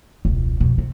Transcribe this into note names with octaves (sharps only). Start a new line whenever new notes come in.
E1 C#2
F2 B2
C3